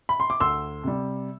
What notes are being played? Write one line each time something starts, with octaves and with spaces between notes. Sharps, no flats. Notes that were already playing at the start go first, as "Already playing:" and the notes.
B5
C6
D6
D2 C6 E6
C3 G3